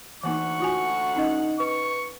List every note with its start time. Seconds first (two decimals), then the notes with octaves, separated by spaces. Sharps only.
0.23 D2 E3 A#3 D#4 F#5 C#6
0.60 F4 F#4 G#5
1.16 C#4 D#4 D#5
1.60 B4 C#6